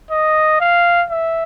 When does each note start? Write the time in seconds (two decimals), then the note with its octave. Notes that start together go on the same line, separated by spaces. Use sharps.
0.11 D#5
0.60 F5
1.11 E5